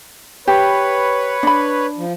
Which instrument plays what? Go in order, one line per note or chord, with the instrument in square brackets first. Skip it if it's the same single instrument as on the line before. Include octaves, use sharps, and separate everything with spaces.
[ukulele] G4 [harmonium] B4 C#5
[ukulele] D4 B5
[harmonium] F3